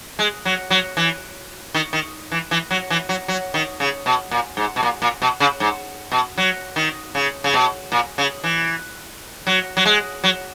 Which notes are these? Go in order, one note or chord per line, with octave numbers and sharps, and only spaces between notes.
G#3
F#3
F#3
E3
D#3
D#3
E3
E3
F#3
E3
F#3
F#3
D#3
C#3
B2
A#2
G#2
B2
A#2
A#2
B2
C#3
G#2
B2
F#3
D#3
C#3
C#3
B2
A#2
C#3
E3
F#3
F#3
G#3
F#3